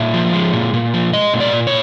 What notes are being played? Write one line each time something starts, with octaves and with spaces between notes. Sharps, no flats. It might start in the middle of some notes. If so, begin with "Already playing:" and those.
Already playing: A#2 E5
F3
G#3
A#2
A#2
F3
G#3 D#5
A#2
D5
A#2
C#5